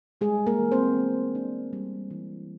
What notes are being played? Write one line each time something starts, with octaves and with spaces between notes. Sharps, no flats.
G3 G#3 G#4
A#3 A#4
E3
C4 C5
B3
D4
G3
E3